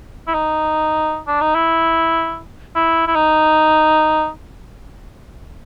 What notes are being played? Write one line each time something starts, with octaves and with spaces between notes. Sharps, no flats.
E4
D#4
D4
D#4
E4
E4
E4
D#4